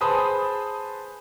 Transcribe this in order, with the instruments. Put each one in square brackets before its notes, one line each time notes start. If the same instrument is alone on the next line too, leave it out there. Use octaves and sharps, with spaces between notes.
[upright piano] G#4 B4 C5 A5 B5 D#6